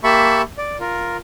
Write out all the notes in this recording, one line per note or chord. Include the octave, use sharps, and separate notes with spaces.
A#3 G4 E5 A5 B5 C#6
D5
F4 A#4